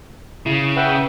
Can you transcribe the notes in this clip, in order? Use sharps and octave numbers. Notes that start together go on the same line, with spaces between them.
C#3 E4
B4 E5 F#5 G5 F#6